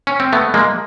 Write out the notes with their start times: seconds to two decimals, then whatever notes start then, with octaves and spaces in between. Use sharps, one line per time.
0.07 C#4
0.20 C4
0.33 A3 B3
0.54 G#3 A#3